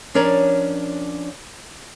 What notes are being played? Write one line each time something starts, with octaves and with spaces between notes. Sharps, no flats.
F3 C#4 D4 A#4 C#5 D5